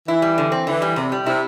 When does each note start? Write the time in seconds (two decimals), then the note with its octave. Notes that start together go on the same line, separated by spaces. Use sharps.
0.08 E3 E4
0.22 G3
0.38 D3
0.52 C4
0.67 D3 E3
0.82 G3
0.96 E2 C3
1.12 G3
1.26 C3 E4